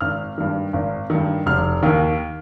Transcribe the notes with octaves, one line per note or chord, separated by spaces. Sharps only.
G#1 F6
G2 D#3
G#1
G2 D#3
F1 F6
D#2 D#3 A#3